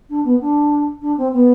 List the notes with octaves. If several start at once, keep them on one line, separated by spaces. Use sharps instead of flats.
D4
B3
D4
D4
C4
B3